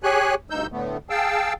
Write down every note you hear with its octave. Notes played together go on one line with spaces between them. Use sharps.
G4 G#4 C#5 G#5 F#6
D2 G2 D#4 E6 G6
A2 D3 A3 B3
G#4 F5 G5 A5 E6